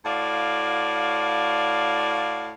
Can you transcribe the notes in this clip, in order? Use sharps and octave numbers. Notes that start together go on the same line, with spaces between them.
A2 F#4 D5 F5